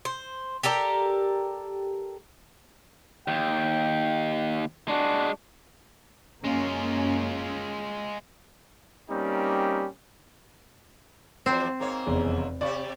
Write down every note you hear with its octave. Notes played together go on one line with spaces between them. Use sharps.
C5
G4 A4 A#4 D5
D#2 G5
G#3 D4 F#4
F#2 G#3 A#3 C#4 F4
G3 A#3 C4 C#4 D#4 G4
E2 F3 C4 C5
G#2 A#3 C#5
F1 E2 C#3
C3 G4 D5 C#6